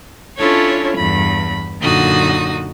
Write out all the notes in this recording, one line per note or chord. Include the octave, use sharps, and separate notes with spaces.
C#4 D4 E4 F4 A4 C#5
E2 G2 B5
F#2 A#2 D3 D#4 F#4 D#6